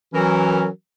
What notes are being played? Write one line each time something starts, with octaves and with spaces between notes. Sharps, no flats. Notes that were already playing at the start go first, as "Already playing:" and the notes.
E3 F#3 C#4 F#4 A#4